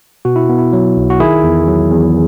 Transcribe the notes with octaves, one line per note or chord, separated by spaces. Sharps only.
B2 F#4
E4
B3
E4
F#3
B1
F#4
D#3 E4 G#4
E2
F#3
E2